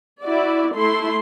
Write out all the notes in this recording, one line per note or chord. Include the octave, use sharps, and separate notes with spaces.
E4 F#4 D5
A3 E4 C6